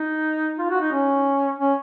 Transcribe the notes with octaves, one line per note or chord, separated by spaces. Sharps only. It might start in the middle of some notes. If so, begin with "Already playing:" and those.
Already playing: D#4
F4
F#4
D#4
C#4
C#4